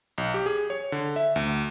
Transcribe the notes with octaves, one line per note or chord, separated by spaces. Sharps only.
B1
G4
G#4
C#5
D3
E5
D2